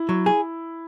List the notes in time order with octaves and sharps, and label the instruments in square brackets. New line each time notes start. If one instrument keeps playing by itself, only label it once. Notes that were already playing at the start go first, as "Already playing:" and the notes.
Already playing: [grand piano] E4
[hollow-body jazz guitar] F#3
G#4